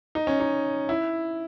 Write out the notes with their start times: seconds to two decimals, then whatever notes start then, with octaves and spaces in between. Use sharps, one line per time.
0.15 D#4
0.27 C#4
0.40 D#4
0.89 E4